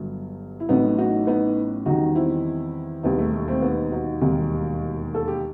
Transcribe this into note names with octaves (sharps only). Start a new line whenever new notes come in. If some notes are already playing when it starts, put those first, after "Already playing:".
Already playing: G1 G2 F#3
E4
A1 A2 F#3 B3 D#4
D#4 F#4
B3 D#4
E2 D#3 G3 D#4 F#4
C4 E4
E1 D#2 D#3 G3 B3 D#4
A3
A3
A3 C4
B3 D#4
D#4 F#4
E1 D#2 D#3 G3
A4
G4